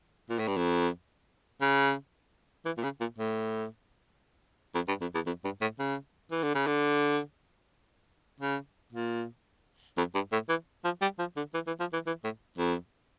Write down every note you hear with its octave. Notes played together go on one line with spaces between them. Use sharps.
A#2
A2
G2
F2
C#3
E3
A#2
C#3
A#2
A2
F2
G2
F2
E2
F2
G2
A2
C#3
E3
D3
C#3
D3
C#3
A#2
F2
G2
A2
E3
F3
G3
F3
D3
E3
E3
F3
E3
E3
A2
F2